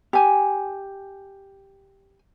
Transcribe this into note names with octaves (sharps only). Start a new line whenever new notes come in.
G4 G#5